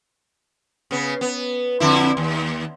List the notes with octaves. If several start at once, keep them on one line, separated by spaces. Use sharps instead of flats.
C#3 B3
B3
F2 D3 E4
D#2